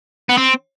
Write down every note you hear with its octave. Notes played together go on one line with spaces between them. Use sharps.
B3
C4